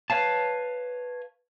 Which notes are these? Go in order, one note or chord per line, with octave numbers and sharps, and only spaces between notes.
B4 C#5 F5 A5